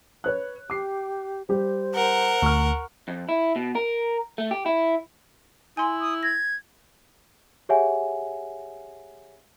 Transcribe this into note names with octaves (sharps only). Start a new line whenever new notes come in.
B4 C#5 F#6
G4 D6 C7
G3 G4 C5
A#4 F#5
D2 C#6 F6
F2
E4
B2
A#4
A3
G4
E4
E4 G#5 C6
D#6
G#6 A#6
G4 G#4 C#5 E5 F#5 G#5